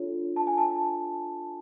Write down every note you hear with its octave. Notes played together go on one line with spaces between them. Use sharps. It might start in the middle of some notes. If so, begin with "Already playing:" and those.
Already playing: D4 F4 A4 C#5
A5
G#5
A5